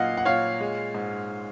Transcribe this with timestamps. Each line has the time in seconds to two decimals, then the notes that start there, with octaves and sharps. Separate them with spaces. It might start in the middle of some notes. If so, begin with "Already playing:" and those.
Already playing: A#2 F#3 A#3 D#5 F5 F#5
0.17 F#5
0.25 A#2 C#5 F5
0.60 G#3
0.95 G#2